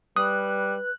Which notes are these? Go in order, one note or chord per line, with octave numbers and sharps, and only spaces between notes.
G3 B4 D#6 F#6